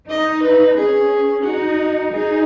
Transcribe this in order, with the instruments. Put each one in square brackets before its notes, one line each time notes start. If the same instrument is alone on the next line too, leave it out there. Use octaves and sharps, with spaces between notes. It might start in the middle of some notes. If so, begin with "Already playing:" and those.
[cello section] D#4 [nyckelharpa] D#5
[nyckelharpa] B4
[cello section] C#4 [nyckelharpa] G#4
[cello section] D#4 [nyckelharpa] F#4
[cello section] D#4 [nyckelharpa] G#4